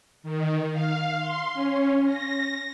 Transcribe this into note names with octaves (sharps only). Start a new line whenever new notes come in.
D#3
F5
C6
C#4
A#6